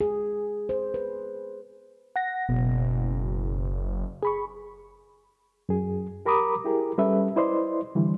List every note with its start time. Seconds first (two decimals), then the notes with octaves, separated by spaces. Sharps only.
0.01 G#4
0.69 C5
0.94 B4
2.16 F#5 A#6
2.49 F#1 B2
4.23 G#4 B5 C#6
5.69 F#2 G#4
6.26 G4 A#4 A#5 B5 D6 D#6
6.65 E4 G4 G#4 A#4
6.98 G3 C#4 G4 A4 B4 E5
7.36 E4 B4 C5 D5 D#5 C6
7.95 D3 E3 G3